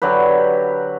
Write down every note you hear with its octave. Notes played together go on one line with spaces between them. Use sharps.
D3 F#3 G4 B4